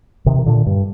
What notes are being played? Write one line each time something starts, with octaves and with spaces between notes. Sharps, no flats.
C3 D#3
D#3
A#2 D3
G2